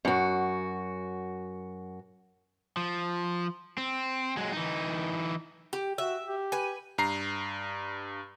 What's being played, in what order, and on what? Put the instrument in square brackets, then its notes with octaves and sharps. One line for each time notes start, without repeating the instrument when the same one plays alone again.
[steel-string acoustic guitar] F#2 F#4
[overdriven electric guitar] F3
C4
F#3 G#3
E3 D#4
[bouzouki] G4
[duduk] F#4 [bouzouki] E5
[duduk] G4
[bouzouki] B4 G#5
[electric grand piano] G2 A#5 C7